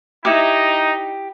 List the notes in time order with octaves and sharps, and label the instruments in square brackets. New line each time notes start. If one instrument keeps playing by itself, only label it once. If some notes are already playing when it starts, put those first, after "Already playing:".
[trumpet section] D#4 [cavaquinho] E4 G4